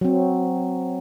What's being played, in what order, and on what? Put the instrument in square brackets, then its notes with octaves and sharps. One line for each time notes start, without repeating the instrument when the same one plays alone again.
[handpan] F#3 C4